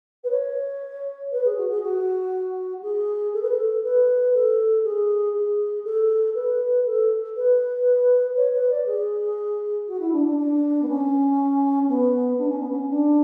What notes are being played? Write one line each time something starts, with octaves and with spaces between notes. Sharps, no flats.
B4
C#5
B4
G#4
F#4
G#4
F#4
G#4
A4
B4
A4
B4
A4
G#4
G#4
A4
B4
A4
B4
C#5
B4
D5
G#4
F#4
E4
D4
D4
D4
B3
C#4
B3
D4
C#4
B3
C#4
D4